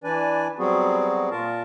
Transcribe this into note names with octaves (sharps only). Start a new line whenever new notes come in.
E3 D4 B4 D5 G#5
F#3 G3 B3 C4 F#4 G#4
A#2 F4 A#4 A5